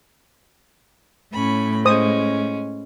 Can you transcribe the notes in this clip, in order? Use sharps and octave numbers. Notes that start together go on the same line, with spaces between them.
A2 C#4 B5
G#3 C#4 C5 D#6